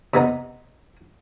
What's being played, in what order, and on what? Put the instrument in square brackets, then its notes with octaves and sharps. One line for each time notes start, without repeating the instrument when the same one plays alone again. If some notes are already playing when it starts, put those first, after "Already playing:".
[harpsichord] C3 B3 D#4